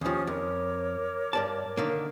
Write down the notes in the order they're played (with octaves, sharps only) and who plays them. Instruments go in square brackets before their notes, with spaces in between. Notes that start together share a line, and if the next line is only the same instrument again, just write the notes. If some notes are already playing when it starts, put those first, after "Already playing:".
[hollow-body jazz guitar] D#2 F3 [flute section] C#4 G4 D#6
[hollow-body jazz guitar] F2 [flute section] A#4 C#5 D6
[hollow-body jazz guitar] G2 D5 A5
D3 D#3 A#3